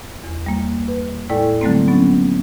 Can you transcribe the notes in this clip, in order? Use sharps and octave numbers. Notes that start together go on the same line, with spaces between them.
E2
G3 A#3
B4
A2 G#3 E4 A4 D5 G5
D3 F#3 G3 A3 A#3 C4
F#3 B3 C#4